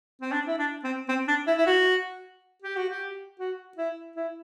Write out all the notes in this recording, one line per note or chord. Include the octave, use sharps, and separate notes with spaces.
C4
D4
E4
D4
C4
C4
D4
E4
E4
F#4
G4
F#4
G4
F#4
E4
E4